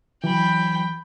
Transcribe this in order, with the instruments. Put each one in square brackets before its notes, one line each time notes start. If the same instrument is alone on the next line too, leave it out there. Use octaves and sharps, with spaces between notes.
[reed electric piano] E3 F#3 [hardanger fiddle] G5 B5